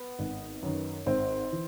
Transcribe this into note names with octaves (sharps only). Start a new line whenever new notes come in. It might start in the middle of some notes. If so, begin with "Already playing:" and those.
Already playing: B3
G#1
F#2 D#3
G#1 C4
E3